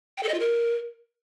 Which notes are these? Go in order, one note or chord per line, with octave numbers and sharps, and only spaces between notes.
G5
A4
D#5
F4
A#4